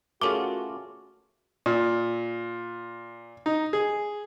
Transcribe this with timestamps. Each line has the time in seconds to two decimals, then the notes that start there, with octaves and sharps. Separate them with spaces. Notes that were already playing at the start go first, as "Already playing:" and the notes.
0.22 A3 C#4 F4 F#4 G#4 A#4 D6
1.66 A#2
3.46 D#4
3.73 G#4